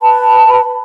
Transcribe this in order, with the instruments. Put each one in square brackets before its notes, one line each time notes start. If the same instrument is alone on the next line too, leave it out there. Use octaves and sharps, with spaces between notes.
[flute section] B4 A5 B5